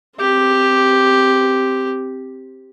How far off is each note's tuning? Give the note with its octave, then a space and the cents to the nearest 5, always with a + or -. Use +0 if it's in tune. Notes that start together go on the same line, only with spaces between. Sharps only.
C4 +0 G4 +0